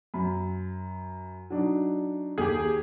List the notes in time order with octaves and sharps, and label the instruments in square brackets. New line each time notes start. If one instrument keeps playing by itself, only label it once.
[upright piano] F#2 B5
F#3 D4 D#4
[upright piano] D#2 [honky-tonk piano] G4 G#4